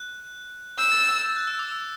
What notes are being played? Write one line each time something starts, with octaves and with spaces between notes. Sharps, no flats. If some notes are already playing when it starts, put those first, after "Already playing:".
Already playing: F#6
E6 G6
A6
G6
A6
F#6
E6
D6
E6